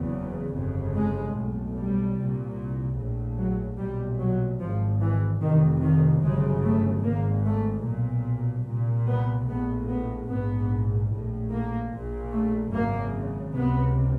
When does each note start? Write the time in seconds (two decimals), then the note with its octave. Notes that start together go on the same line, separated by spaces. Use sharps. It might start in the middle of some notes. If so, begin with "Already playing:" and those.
Already playing: F#1 E2 C#3
0.54 G1 F2 C#3
0.94 G#3
1.35 B1 A2
1.76 G3
2.17 C2 A#2
2.98 A#1 A2
3.39 F#3
3.79 B1 A#2 G3
4.20 F#3
4.60 G#1 G#2 F3
5.01 E3
5.41 F1 F2 C3 D#3
5.82 D#3
6.23 G1 F#2 C#3 G#3
6.64 A3
7.04 G#1 G#2 A#3
7.45 A3
7.85 B1 A#2
8.67 C2 A#2
9.07 B3
9.48 A#1 A2 B3
9.88 B3
10.29 A#1 G#2 B3
11.11 A#1 A2
11.51 A#3
11.92 A#1 A#2
12.32 A3
12.73 G#1 F#2 C#3 A#3
13.54 C#2 C3 B3